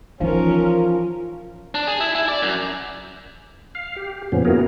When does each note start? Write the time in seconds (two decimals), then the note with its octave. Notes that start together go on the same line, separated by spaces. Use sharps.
0.20 E3 F3 C#4 D#4 A#4
1.75 D4
1.87 G#4
2.00 E4
2.15 E4
2.28 D5
2.42 F#2
3.75 F5
3.96 G4
4.32 F2 A#2 C#3 F3 B3 C#4
4.45 A#3 B3 E4 F#4 G#4 A#4